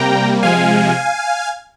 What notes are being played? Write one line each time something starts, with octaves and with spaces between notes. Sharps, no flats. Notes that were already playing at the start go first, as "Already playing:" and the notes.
Already playing: C3 G3 A#3 G5 A#5
C3 F3 G#3 F5 G#5